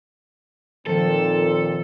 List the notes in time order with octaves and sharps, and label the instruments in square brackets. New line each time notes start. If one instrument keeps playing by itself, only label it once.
[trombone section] A#2 C4 [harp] D#3 F3 G5 [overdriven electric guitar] A4